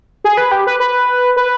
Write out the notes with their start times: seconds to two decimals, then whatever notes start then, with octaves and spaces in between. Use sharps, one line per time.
0.24 G#4
0.37 B4
0.52 G4
0.67 B4
0.80 B4
1.37 B4